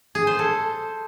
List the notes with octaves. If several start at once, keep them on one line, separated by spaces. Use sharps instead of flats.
G#4
C5
A4